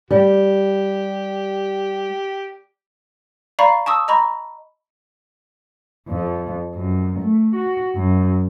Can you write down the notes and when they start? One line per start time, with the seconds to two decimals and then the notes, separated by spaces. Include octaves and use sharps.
0.11 G3 G4
3.59 D5 F5 A#5 B5 C#6 C7
3.86 A5 C#6 D#6 E6
4.08 D#5 A#5 B5 C#6
6.09 F2
6.74 F#2
7.20 A3
7.56 F#4
7.96 F#2